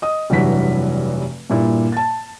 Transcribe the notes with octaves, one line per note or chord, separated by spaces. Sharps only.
D#5 D#6
F1 G2 E3 F#3 B6
G2 A#2 E4
A5 A6